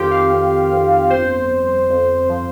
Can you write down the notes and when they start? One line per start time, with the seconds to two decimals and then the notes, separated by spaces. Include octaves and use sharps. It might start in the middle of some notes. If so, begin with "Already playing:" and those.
Already playing: F2 D#3 F4 G4
0.11 F5
0.32 F2
0.72 F2
1.10 G1 C5
1.50 G1
1.90 F2
2.29 F3